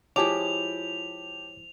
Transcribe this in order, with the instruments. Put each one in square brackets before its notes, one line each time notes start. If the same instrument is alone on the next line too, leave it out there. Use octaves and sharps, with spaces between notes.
[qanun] F3 G#3 E4 [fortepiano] G4 A5 D6 [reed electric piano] C#5 [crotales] F7